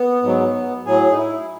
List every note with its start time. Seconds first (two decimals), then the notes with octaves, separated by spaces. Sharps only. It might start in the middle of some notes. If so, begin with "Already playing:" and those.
Already playing: B3
0.23 G#2 F#3
0.86 A2 F#3 G#4
1.12 D#4
1.18 E4